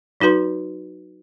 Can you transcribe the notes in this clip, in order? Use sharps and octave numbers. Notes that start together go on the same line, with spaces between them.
F#3 D#4 F#4 B4 C6